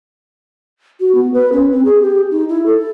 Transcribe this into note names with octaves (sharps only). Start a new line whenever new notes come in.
F#4
B3
B4
C#4
C4
G#4
G4
D#4
E4
A4